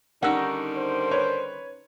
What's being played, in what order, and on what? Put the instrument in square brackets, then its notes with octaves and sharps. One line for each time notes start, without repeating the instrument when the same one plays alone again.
[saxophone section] D3 D#3 G3 [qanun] C#4 D#4 [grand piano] F#5 E6
[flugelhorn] C5
[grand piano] B4 C#5